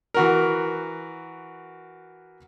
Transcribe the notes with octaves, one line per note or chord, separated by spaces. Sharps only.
E3 F#4 A#4